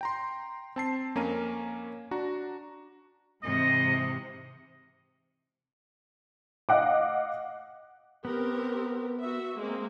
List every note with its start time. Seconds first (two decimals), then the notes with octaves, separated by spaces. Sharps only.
0.01 G5 A#5 C6
0.76 C4 A5 C7
1.15 F2 A#3 C#4 A#5 D#7
2.11 D4 F#4 A#5
3.43 G#2 C3 E3 D#5
6.69 D#5 F5 F#5 D6
8.25 B3 C4 G4 A#4
9.20 F#4 E5
9.57 G#3 A#3 C4